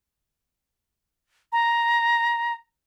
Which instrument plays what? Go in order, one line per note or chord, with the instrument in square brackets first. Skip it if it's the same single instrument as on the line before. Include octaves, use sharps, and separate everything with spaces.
[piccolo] A#5